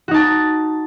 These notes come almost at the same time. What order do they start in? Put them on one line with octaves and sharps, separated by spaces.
F#4 D#4 A5